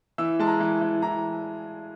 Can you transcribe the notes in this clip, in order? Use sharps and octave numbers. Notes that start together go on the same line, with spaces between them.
E3 E6
G#3 A5
A#5
E3
E3
E3 A#5